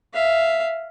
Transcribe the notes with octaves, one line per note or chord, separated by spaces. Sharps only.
E5 F5